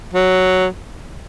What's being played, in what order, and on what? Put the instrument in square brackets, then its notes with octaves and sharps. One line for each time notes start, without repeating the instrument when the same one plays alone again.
[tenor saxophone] F#3